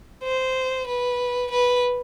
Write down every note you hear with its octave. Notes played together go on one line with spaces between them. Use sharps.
C5
B4
B4